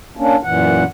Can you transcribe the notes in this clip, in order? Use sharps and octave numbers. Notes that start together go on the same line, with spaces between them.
A#3 C#4 D4
F#2 A#2 E3 F#5